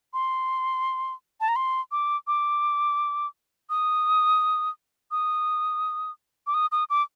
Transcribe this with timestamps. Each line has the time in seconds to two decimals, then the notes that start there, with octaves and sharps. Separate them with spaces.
0.14 C6
1.41 A5
1.48 A#5
1.56 C6
1.92 D6
2.27 D6
3.70 D#6
5.11 D#6
6.47 D6
6.54 D#6
6.72 D#6
6.90 D6